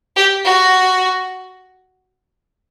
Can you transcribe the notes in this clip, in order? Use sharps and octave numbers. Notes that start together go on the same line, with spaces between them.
G4
F#4